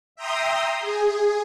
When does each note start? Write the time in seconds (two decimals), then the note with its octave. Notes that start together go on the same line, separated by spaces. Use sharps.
0.16 E5 G5 A#5 C6 D#6
0.80 G#4